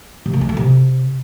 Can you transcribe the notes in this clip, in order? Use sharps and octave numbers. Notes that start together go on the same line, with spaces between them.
C3
A#3
G#3
A3
C3